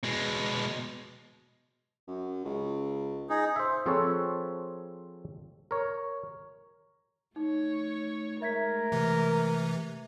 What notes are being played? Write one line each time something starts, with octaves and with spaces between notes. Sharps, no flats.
B2 G#3
F#2
C#2
D#4 G#4
C5 E5
F3 C4 G#4 A4 B4 C#5
A#4 C#5
A3 D#4 C#5
G#3 A3 A#4 E5 G#6 B6
C3 E3